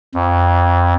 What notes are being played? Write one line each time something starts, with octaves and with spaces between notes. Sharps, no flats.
F2